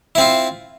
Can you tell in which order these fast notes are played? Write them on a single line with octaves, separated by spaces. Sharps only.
E4 C4 F4